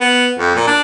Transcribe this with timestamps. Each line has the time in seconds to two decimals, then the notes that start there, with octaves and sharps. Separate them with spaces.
0.01 B3
0.39 F2
0.55 A#2
0.67 D4